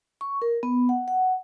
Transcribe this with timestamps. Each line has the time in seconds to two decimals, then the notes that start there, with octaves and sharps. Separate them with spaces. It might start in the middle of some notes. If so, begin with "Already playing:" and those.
0.21 C#6
0.42 A#4
0.63 B3
0.89 F#5
1.08 F#5